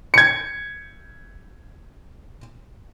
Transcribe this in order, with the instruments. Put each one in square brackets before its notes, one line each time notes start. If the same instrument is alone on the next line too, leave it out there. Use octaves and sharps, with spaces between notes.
[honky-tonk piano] G#6 C#7